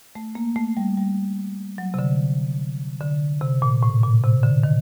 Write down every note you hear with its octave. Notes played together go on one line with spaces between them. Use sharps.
A3
A#3
A3
G3
G3
F#3
C3
D3
D3
C3
A#2
A2
A#2
C3
D3
D#3